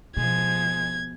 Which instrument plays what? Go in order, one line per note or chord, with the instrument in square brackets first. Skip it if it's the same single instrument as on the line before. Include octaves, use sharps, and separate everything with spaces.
[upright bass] B2 [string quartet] F3 G#3 [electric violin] G#6